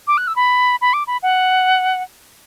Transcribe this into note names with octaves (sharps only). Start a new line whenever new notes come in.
D6
F#6
E6
B5
B5
D6
B5
F#5